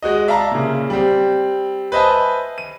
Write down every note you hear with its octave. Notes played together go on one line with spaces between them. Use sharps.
G#3 F#4 D#5
D5 E5 F5 A5 A#5
A#2 C#3
G3 C4
B4 C5 D#5 E5 G#5 A5
D#7